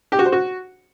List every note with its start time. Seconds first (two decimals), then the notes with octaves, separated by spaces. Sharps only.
0.12 G4
0.19 F#4
0.26 C5
0.32 F#4